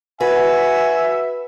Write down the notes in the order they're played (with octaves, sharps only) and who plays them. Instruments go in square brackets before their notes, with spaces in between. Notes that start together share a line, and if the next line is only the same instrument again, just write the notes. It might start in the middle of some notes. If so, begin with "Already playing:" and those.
[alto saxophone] F#4 [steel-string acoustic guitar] B4 [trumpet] E5 [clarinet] G#5